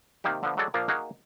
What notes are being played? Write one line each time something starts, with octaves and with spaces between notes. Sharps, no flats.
C3 D#3 A#3 D#4 G4
D3 F3 B3
F#3 G#3 A4 D5
A#2 F3 A#3 D4 F4 A#4
A#3 D#4 F#4 G#4